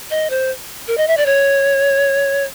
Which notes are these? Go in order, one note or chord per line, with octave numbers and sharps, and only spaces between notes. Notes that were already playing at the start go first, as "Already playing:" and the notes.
D#5
C5
A#4
D#5
E5
D5
C#5